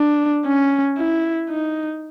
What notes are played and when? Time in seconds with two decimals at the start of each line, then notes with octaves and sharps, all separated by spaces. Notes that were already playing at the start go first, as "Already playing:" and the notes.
Already playing: D4
0.45 C#4
0.97 E4
1.50 D#4